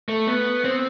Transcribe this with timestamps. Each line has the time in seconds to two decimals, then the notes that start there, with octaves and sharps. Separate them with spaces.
0.08 A3
0.27 B3
0.64 C4